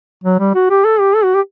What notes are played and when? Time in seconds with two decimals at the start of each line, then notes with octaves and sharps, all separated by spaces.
0.24 F#3
0.40 G3
0.55 F#4
0.70 G4
0.85 A4
1.00 G4
1.15 A4
1.24 F#4
1.35 G4